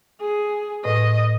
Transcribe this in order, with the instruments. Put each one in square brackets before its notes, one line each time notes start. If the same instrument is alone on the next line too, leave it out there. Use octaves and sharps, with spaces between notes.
[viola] G#4
[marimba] A2 B4 [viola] D#5